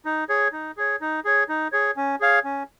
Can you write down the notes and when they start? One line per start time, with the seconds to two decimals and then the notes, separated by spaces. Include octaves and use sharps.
0.05 D#4
0.29 G#4 C#5
0.52 D#4
0.77 G#4 C#5
1.01 D#4
1.25 G#4 C#5
1.49 D#4
1.72 G#4 C#5
1.97 C#4
2.20 G#4 C#5 F5
2.44 C#4